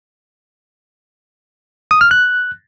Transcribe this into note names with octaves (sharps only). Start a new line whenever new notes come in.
D#6
F6
F#6